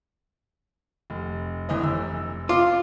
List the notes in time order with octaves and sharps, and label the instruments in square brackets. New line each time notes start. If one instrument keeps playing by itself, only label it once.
[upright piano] F1
G1 E3 D#5
F1 E6
[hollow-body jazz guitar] F4 [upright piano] D6